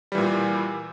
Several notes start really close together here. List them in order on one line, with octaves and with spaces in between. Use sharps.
G3 E3 A#2